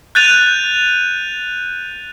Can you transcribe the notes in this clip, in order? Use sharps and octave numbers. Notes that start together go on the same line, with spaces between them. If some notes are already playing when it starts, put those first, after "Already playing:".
F#6 G6 A6 D#7 F7